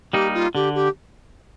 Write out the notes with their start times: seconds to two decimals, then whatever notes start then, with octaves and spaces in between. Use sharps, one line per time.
0.13 G3 A#3 D#4 G4
0.34 F4
0.55 D3 G4
0.75 G4